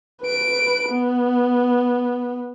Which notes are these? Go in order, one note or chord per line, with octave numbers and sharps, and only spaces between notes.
B4 D7
B3